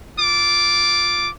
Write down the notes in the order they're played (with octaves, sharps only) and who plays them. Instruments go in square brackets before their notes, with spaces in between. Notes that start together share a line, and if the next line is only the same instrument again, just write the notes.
[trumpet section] F4 D6